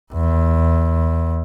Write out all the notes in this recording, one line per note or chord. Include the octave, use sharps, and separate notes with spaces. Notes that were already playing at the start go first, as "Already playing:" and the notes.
E2